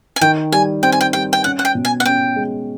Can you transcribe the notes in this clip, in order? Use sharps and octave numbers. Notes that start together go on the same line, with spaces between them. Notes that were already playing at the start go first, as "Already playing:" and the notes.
G#5
D#3 G5
G3 G#5
C4 G5
G#5
G5
G3 G5
G5
C#4 F#5
F#5
G5
B2
G#5
F#5
C#4 G5
G#3